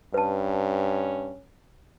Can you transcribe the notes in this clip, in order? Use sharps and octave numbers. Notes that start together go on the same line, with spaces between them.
G2 C#4 B4 A5